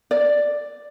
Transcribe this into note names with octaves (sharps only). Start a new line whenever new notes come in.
D5